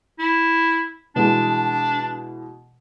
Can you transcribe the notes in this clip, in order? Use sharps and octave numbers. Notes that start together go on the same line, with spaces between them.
E4
B2 E3 G#3 D4